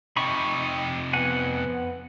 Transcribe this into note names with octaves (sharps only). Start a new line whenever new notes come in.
F2 C3 D#4 B5 C#6
B3 F#5 G#5